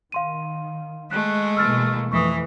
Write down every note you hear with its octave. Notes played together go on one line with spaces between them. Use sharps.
D#3 F5 C6 D#7
G#3 A3 F#6
B2 E3 A#3 E6 F6 A6
F2 E3 A3 C#6 D#6